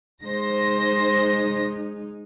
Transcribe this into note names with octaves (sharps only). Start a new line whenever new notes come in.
G#3 D#4 C5 A#6